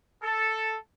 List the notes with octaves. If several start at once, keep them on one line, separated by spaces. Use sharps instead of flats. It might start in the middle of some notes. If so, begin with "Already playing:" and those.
A4